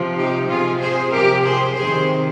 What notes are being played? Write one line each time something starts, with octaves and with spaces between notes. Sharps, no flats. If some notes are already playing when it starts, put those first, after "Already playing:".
Already playing: C3 F3
D#4 G4
C3 F3 F4 G#4
G#4 C5
C3 F3 G4 A#4
G#4 C5
C3 D#3 G#4 C5